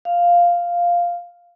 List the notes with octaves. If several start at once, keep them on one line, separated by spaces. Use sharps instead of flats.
F5